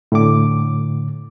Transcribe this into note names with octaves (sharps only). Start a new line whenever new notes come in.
A2 D3 D6